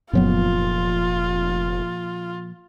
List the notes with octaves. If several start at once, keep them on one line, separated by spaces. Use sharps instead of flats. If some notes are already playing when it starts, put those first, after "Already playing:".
F1 F#2 A#2 F3 F#3 B3 F4